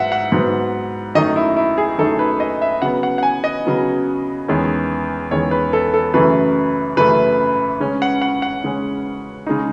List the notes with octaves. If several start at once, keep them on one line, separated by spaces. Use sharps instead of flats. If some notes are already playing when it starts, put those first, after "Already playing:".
Already playing: G#2 F#3 E5 F#5
F#5
G#2 F#3 B3
F#2 D#3 A3 D#4 D#5
E4
E4
G#4
F#2 D#3 A3 D#4 A4
B4
D#5
E5
C#3 F#3 B3 F#5
F#5
F#5
G#5
D#5
C#3 F#3 B3
E2 D#3 G#3 C#4
E2 D#3 G#3 C#4 C#5
B4
A4
A4
F#2 C#3 E3 A3 B4
F#2 C#3 E3 A3 B4
C#3 G#3 C#4
F#5
F#5
F#5
C#3 G#3 C#4
C#3 G#3 D#4